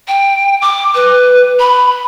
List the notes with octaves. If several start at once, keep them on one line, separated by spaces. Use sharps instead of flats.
G5
D6
B4
B5